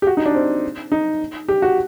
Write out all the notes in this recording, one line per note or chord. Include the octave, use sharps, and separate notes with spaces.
G4
F#4
D#4
D4
C4
D#4
G4
F#4